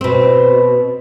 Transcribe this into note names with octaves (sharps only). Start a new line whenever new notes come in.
B2 C4